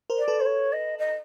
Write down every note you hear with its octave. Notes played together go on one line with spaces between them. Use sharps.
A#4 C5
D5
A4 B4
C5
C#5
D#5
D#5